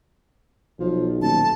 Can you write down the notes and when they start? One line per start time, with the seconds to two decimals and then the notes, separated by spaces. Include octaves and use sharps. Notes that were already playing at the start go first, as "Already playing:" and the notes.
0.80 B1 F3
1.22 D#1 A5